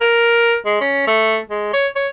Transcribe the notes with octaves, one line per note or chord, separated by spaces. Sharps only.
A#4
G#3
C#4
A3
G#3
C#5
C#5